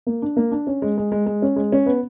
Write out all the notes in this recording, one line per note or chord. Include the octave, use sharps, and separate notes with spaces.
A#3
D4
A#3
D4
C#4
G#3
G#3
G#3
G#3
C#4
G#3
C#4
B3